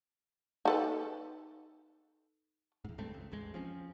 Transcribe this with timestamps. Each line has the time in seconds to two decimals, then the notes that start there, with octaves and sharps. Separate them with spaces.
0.65 D#4 A4 B4
2.84 E2 G#2
2.98 C#2 G2 A3 C4
3.14 C#2
3.32 A1 E2 G#3
3.54 F3 C4 C#4